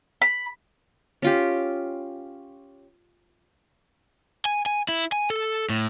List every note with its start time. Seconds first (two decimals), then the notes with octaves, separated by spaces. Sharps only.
0.22 B5
1.22 C#4 F4 G4
4.45 G#5
4.66 G#5
4.89 E4
5.12 G#5
5.30 A4
5.69 A2